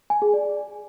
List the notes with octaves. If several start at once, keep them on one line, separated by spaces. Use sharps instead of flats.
G#5
G#4
D5